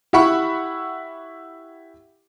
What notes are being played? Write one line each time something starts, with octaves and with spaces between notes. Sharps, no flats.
E4 G4 E5 F#5 B5 C#6